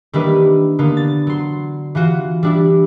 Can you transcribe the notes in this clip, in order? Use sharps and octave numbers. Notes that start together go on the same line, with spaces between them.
D#3 G3 A#3 D4 E4 B4
D3 A#3 B3
A6
F#3 C6
E3 F4 F#4
G3 D4 E4